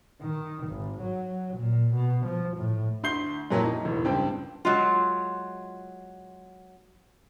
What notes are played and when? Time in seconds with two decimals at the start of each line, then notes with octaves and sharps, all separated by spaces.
0.21 D#3
0.67 G#1
1.01 F#3
1.57 A#2
1.94 B2
2.25 F3
2.57 A2
3.03 D2 C6 G6 C7 G7
3.50 F2 A#2 F#3 A#3 E4
3.65 D#4
3.85 E1 A2
4.05 C#2 G2 C4 G5
4.65 F#3 G#3 F4